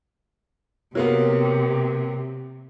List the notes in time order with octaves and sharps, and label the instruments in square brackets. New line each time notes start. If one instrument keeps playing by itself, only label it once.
[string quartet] C3 [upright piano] F#3 A#3 B3